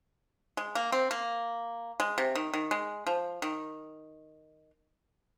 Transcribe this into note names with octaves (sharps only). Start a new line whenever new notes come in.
G#3
A#3
C4
A#3
G#3
C3
D#3
D#3
G#3
F3
D#3